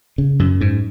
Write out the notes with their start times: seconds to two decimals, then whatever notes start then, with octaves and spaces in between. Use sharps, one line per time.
0.18 C#3
0.39 F#2
0.61 G#2